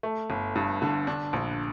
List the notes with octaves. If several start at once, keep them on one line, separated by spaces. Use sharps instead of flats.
A3
G1
G2
D3
D4
A#1